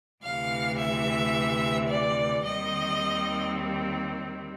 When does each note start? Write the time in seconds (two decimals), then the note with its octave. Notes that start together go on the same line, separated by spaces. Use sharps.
0.23 D2 C3 E3 F5
0.79 E5
1.90 D5
2.45 D#2 D#3 G3 C4 D#5